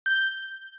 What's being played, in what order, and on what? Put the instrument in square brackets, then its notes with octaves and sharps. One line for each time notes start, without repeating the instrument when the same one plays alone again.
[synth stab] G6